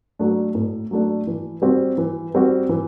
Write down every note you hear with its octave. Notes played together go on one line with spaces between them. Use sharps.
F#3 A3 D4
A2
F#3 A3 D4
E3
G3 C4 F#4
E3
G3 C4 F#4
E3